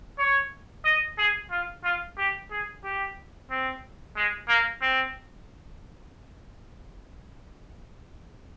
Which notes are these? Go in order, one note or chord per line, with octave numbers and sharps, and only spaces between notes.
C#5
D#5
G#4
F4
F4
G4
G#4
G4
C4
G#3
A#3
C4